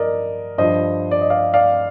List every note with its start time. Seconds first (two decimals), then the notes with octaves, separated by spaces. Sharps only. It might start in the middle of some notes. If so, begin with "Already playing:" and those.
Already playing: G2 F3 A#4 D5 D#5
0.58 G2 F3 C5 D#5
1.11 D5
1.21 D#5
1.30 D5 F5
1.54 D5 F5